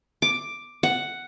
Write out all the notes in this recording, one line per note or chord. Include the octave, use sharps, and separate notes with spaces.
D6
F#5